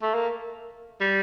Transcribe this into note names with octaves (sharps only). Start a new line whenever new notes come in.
A3
A#3
G3